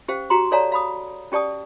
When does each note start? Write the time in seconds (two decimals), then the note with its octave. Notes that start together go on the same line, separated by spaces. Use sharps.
0.08 C#4 G4 C5 F5
0.30 F#4 G4 A#5 C6
0.52 A4 C#5 D5 F5 A5 A#5
0.72 F5 B5 D#6
1.32 C#4 G4 D5 A5 D#6